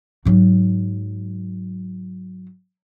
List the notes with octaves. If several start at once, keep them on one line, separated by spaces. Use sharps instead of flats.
G#2 F#3